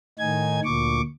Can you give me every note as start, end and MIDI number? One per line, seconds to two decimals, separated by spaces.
0.19 0.60 45
0.19 0.60 51
0.19 0.60 63
0.19 0.60 80
0.19 0.60 92
0.64 1.01 38
0.64 1.01 46
0.64 1.01 85
0.64 1.01 86